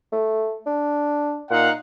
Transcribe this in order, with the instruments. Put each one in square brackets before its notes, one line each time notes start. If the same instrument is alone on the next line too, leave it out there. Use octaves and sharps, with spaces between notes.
[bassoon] A3
D4
[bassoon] A#2 [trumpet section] D#4 F5 F#5